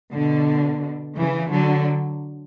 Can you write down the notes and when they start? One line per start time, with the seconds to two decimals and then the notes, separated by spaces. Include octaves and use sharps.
0.12 B2 D3
1.16 C#3 E3
1.49 D3 F#3